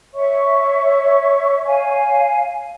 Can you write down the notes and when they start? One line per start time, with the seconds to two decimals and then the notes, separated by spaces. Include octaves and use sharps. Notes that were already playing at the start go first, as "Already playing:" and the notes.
0.14 C#5 E5 C#6
1.66 F5 G#5